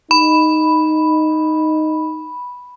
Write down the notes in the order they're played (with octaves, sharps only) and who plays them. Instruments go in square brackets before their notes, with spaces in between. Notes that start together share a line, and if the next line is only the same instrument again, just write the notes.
[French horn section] D#4 [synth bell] B5